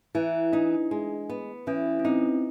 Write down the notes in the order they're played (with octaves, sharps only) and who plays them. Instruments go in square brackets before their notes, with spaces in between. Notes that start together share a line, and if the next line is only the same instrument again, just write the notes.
[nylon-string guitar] E3 [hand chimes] E4
[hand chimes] D4 [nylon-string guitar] D#4
[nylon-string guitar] G#3
B3
[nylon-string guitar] E3 [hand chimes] C#4
[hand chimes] C#4
[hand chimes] C4 [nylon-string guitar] D#4